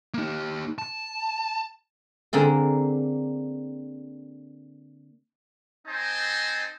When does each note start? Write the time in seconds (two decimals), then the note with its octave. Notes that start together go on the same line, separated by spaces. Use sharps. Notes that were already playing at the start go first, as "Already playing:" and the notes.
0.14 A#3 D#4
0.78 A5
2.33 D3 A#3 C4 G#4
5.88 C4 D#4 C5 D#5 G#5 A5